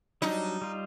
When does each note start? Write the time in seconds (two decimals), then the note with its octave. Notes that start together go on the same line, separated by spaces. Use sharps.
0.22 F#3 G3 D4 D#4
0.61 G3 F4